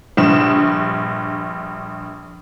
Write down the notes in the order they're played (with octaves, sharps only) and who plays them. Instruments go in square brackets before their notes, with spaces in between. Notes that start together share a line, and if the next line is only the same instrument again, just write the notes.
[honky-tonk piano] A#1 G2 E7